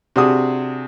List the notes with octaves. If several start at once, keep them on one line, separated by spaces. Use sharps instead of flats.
C3 D4 F#4 G#4 D#6